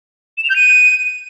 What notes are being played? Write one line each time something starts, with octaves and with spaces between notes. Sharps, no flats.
E7
F7
G6
D#7